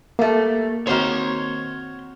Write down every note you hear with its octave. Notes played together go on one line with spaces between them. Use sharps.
G3 A3 A#3 E5 A5
D#3 C4 F#4 C5 C#5 C6 F6